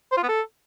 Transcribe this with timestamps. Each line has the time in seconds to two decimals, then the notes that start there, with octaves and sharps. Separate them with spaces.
0.12 C5
0.17 F4
0.23 B3
0.29 A4